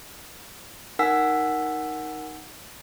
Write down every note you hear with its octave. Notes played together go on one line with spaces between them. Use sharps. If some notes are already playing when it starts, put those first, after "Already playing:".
D#4 A#4 F#5 G#5 E6 B6